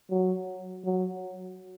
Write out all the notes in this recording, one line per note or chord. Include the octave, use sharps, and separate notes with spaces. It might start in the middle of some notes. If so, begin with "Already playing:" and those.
F#3
F#3